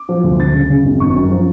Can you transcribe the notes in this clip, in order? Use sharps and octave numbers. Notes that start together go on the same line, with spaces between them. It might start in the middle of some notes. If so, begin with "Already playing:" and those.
Already playing: D6
F3
D2
D2 A6
C#3
C#3
G#1
G#1 C#6
F#2
F3